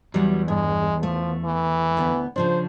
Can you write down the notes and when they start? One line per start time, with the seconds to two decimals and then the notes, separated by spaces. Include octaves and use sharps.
0.14 E2 F#3 G3
0.48 G2 G#3
1.03 F3 A3
1.45 E3
1.97 D2 B3
2.36 C#3 F3 D4 C5